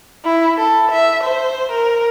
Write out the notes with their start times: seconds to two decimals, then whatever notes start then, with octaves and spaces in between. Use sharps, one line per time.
0.25 E4
0.57 A4
0.91 E5
1.23 C5
1.72 A#4